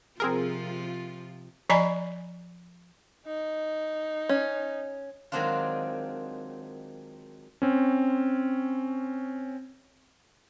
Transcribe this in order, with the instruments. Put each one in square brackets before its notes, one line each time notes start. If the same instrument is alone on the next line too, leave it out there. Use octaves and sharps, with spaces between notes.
[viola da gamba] C3 F3 F4 [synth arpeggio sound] C4 G#4 A#4
[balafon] F3 D5 D#5 G#5 A#5 B5
[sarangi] D#4
[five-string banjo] C#4
[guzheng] D#3 F#3 G#3 C4 D4 F4
[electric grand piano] C4 C#4